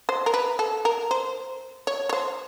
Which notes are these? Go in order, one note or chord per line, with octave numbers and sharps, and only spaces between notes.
C5
A#4
B4
A4
A#4
C5
C#5
C#5
C5